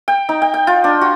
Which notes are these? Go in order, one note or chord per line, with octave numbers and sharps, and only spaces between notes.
G5
D#4
G5
G5
F4
D4
F#4